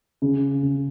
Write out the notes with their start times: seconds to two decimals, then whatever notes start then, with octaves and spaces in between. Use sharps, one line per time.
0.22 C#3
0.63 C#3